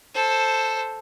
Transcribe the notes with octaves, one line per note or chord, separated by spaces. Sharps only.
A4 C5